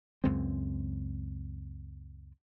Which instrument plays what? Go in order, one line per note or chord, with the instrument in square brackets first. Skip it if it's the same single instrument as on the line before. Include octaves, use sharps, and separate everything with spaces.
[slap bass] C#2 F#2 G#3 C4